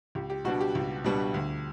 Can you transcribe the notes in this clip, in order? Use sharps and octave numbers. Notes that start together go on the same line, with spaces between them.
C#2 G4
G4
B2 G3 B3 D4 F#4
G4
C#2
B2 G3 B3 D4
D2